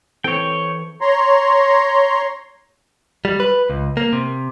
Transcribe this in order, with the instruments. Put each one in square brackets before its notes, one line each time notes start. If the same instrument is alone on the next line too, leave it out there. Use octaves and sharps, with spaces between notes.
[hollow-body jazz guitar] E3 C4 A4 [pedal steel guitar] C#5 G5
[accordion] C#5 A#5 C6
[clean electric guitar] G3
B4
C#2
A#3
C3